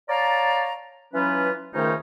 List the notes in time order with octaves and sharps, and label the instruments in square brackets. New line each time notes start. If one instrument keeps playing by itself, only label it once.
[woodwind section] C#5 D5 F5 A5 A#5
E3 F#3 C#4 F4 B4
C#2 D#3 A3 C#4 D#4 C5